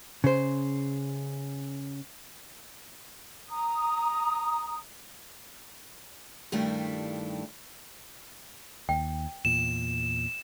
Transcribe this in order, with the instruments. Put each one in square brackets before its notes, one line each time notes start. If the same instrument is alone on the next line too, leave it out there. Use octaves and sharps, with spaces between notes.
[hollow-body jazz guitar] C#3 C5
[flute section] A#5 D#6
[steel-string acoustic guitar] G2 D#3 G3 A3 D4 E4
[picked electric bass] D#2 [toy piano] G5
[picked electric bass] E2 A#2 [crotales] E7